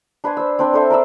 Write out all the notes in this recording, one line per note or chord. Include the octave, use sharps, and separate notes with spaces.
D4 B4 C5 G#5
C5 E6
C4 D4 B4
D4 A4 C5 E5
A#4 D5 B5 E6